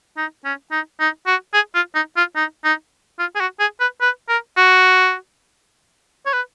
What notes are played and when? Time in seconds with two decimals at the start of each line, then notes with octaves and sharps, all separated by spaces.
0.17 D#4
0.45 C#4
0.71 D#4
1.00 D#4
1.27 F#4
1.54 G#4
1.75 F4
1.95 D#4
2.17 F4
2.36 D#4
2.65 D#4
3.19 F4
3.35 G#4
3.40 F#4
3.60 G#4
3.80 B4
4.01 B4
4.29 A#4
4.57 F#4
6.26 C#5
6.33 B4